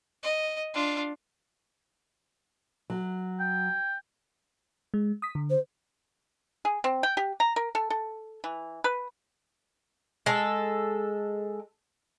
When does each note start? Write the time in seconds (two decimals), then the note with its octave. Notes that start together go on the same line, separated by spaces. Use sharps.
0.23 D#5
0.74 D4 F4
2.90 F#3
3.40 G5
4.94 G#3
5.22 D#6 B6
5.35 D3
5.50 C5
6.65 G#4
6.84 C4
7.03 G5
7.17 G4
7.40 A#5
7.56 A#4
7.75 A4
7.90 A4
8.44 E3
8.84 B4
10.26 G#3 A4